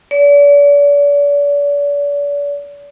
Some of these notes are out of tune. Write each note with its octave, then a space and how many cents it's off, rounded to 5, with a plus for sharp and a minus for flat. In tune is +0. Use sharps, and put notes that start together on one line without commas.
D5 -40